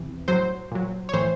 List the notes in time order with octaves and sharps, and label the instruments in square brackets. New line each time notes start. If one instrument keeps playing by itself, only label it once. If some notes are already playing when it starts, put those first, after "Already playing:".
Already playing: [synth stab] E2 C3 E3
A2 F#3 C5
A#2 F#3
C#5
A2 E3 C5